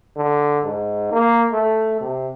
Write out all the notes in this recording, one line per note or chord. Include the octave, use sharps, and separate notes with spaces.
D3
G#2
A#3
A3
C3